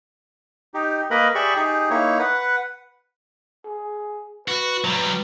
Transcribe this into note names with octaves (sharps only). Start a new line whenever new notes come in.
D#4 G4
A#3 A#4 B4 D#5 B5
G4 G#4 D5 E5 B5 C#6
D#4 G4 G#4
A#3 D#4 E4 C#5
B4 F#5
G#4
F#4 B4
F#3 G3 B4